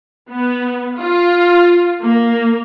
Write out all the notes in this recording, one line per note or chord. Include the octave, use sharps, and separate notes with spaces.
B3
F4
A#3